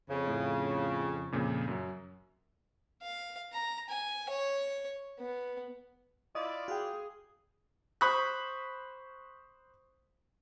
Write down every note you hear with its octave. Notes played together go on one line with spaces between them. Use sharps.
F2 C#3
A2
F2 A#2 C#3
F#2 F#3
F5
A#5
G#5
C#5
B3
E4 F4 D5 D#5
F#4 G#4 F5 G5
C5 B5 C#6 D#6 F#6